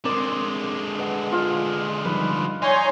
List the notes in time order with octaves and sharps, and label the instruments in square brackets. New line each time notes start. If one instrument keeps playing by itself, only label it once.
[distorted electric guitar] D3 G#3 [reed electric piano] C4 A#4 [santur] D5 C6
[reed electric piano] B4 D#5 F#5
[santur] F4 F5
[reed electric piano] F3 G3 D#4 [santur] B4
[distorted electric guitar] D#4 [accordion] C#5 G#5 C6 [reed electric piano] D5